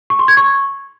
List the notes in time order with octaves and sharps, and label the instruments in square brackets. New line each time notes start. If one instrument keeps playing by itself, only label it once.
[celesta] C#6
C6
G#6
C#6